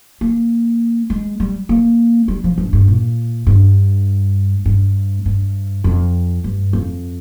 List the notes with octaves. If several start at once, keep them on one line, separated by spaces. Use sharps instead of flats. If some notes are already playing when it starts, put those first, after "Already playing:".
A#3
G#3
G3
A#3
G3
F3
G2
G2
A#2
G2
G2
G2
F2
G2
F2